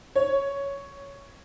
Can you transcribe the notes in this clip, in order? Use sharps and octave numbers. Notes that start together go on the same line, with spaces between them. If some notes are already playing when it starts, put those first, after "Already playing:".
C#5